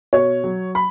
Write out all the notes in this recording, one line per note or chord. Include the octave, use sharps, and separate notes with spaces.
B2 C#5
F#3
B5